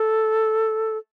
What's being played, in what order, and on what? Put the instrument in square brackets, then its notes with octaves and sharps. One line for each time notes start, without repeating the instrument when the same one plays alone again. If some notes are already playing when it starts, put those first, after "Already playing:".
Already playing: [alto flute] A4